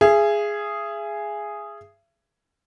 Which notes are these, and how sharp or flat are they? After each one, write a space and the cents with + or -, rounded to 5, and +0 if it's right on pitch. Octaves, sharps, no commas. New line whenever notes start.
G#4 +0 E5 +40